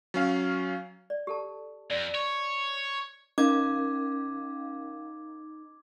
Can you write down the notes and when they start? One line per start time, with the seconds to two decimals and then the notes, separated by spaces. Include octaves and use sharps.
0.14 F#3 C#4 F5
1.10 D5
1.27 G4 A4 A5
1.90 F2 D5
2.15 C#5
3.38 C#4 D#4 A#4 F5 D6 G#6